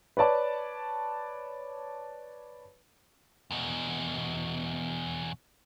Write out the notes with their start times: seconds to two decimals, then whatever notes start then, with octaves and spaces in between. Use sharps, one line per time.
0.17 B4 C#5 D5 A5
3.51 E2 B2